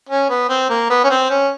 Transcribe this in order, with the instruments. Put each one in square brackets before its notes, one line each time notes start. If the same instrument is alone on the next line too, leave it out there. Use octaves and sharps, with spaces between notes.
[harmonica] C#4
B3
C4
A#3
B3
C#4
C4
C#4